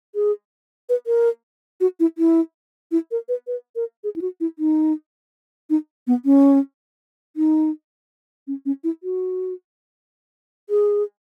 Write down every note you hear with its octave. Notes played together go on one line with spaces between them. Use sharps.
G#4
B4
A#4
F#4
E4
E4
E4
A#4
B4
B4
A#4
G#4
E4
F#4
E4
D#4
D#4
B3
C#4
D#4
C#4
C#4
E4
F#4
G#4